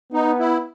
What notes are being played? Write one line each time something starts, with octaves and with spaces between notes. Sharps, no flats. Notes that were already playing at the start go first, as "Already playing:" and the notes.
B3 D#4
E4